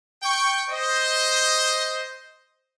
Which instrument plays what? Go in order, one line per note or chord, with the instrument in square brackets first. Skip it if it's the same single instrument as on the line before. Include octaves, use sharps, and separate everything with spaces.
[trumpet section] G5 C#6
C5 D#5